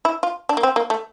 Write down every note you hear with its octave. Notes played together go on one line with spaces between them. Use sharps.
E4
F4
D4
A#3
C4
A#3
A3